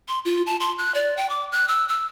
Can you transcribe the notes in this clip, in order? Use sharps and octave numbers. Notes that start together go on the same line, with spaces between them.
C6
F4
A5
C6
F#6
D5
G5
D6
F#6
E6
E6